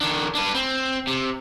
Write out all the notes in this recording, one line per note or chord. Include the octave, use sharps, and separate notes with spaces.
D#3 D4
D4 B4
C4
C3